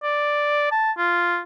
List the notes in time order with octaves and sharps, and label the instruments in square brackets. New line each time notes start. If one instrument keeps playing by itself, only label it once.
[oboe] D5
A5
F4